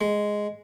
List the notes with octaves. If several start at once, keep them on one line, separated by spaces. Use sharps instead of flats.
G#3